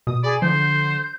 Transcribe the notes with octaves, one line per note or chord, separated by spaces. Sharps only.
B2 D#6
G#4 D5 B5
D3 F3 C5 G6